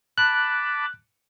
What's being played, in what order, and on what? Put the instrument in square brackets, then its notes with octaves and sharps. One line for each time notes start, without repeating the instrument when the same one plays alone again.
[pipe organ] A5 B5 D6 [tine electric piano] F#6